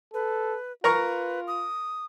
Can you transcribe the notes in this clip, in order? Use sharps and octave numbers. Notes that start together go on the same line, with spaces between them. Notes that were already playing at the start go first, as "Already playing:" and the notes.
A4 B4
F4 A#4 B4 A#5 C#6
D#6